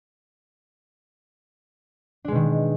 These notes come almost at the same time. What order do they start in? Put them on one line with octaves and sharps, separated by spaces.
D4 G#3 B2 D#3